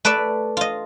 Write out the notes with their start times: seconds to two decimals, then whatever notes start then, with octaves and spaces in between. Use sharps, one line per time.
0.05 A3 B4 D5 E5
0.57 F4 D#5